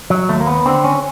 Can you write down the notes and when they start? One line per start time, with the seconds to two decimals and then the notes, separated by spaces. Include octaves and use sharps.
0.10 F#3
0.29 D#2 A3
0.40 A#3
0.47 B3
0.65 D3 C4
0.84 C#4